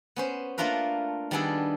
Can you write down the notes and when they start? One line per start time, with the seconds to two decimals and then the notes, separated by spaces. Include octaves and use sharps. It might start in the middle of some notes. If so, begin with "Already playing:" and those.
0.16 B3 C#4 C5
0.58 A3 A#3 D4 F4 A#4 B4
1.31 D#3 G3 B3 D4 G#4 A4